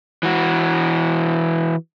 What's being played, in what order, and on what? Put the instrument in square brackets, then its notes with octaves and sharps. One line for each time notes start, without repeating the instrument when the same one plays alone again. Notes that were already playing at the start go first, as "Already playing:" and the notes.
[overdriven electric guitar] E3 F#4